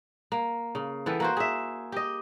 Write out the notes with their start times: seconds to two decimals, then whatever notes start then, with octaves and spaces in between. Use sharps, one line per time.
0.32 A#3
0.75 C#3
1.06 E3 B3 A4 G5
1.20 A#3 F#4 C5
1.37 G#4 E5
1.92 G4 D#5